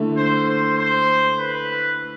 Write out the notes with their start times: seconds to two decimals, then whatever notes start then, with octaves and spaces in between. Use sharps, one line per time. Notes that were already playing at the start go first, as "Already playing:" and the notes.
Already playing: D3 A3 E4
0.17 C5
0.48 C5
0.78 C5
1.40 B4